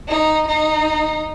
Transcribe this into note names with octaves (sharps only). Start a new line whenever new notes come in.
D#4
D#4